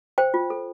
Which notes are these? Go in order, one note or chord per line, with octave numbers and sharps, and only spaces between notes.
C5 G5
F4
A4